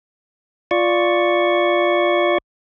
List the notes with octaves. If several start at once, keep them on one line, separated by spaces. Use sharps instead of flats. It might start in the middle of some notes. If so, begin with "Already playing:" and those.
F4 D5 C#6